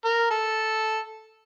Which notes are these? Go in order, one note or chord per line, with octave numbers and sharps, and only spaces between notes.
A#4
A4